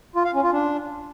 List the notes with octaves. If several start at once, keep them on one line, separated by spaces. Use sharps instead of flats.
F4
F5
C#4
F4
D4